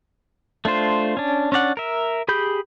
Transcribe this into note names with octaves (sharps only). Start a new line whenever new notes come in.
A3 D4 F4 C5
C#4 D4
C#4 D4 D5 F#5
A#4 E5
G4 G#4 B5 G6